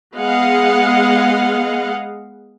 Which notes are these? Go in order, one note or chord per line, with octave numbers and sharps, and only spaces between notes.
G#3 B3 G#4 D#5 F5 F#5